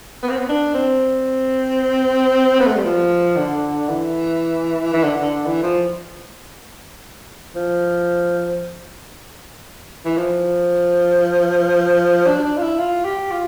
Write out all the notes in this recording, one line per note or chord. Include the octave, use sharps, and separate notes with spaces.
B3
C4
B3
D4
C4
B3
A3
G3
F3
D3
E3
E3
D3
D3
E3
F3
F3
E3
F3
D4
D4
F4
E4
F4
G4
F4